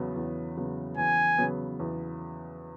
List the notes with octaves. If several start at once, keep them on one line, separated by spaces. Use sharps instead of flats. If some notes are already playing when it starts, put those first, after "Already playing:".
Already playing: E2 C#3 F#3 B3
E2
C#3 F#3 B3
E2 G#5
C#3 F#3 B3
E2